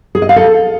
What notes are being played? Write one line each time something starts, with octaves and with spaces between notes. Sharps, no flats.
G#4
D#5
F5
A4